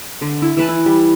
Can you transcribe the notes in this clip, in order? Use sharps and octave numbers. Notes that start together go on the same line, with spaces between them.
D3
E4
E3 B4 A5
E4
G3